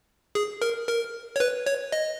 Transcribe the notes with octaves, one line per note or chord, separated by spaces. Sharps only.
G#4
A#4
A#4
C#5
B4
C#5
D#5